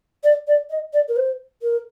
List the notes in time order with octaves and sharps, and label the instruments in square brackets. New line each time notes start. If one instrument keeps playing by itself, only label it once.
[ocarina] D5
D5
D#5
D5
A#4
C5
A#4